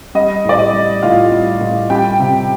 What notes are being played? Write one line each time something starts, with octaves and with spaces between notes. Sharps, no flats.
G3 D#5
A2 D5
D#5
G3
A2 F4 F5
G3
A2
G3 G4 G5
C3